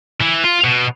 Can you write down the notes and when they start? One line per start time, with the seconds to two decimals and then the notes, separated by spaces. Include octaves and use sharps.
0.21 E3
0.44 F4
0.64 B2